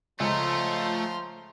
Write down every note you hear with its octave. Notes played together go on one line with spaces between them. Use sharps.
C#2 F3 A3 A#5 C6